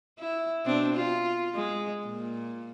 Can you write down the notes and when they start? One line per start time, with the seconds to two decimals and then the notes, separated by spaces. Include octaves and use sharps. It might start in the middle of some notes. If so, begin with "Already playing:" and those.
0.19 E4
0.65 B2 C4 D4
0.95 F4
1.54 G#3
2.06 A#2